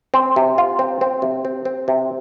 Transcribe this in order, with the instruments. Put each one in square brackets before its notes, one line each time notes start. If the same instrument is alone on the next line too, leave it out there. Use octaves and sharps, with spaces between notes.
[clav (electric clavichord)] C4
C3
F4
C4
C4
C3
C4
C4
C3